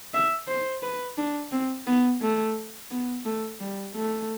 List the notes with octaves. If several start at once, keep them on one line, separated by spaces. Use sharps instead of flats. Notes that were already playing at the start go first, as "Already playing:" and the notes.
E5
C5
B4
D4
C4
B3
A3
B3
A3
G3
A3